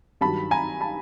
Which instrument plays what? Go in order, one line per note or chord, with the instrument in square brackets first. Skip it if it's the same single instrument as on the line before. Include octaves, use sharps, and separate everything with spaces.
[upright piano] G2 D#3 F#3 A5 B5
G#5 A#5
A5 B5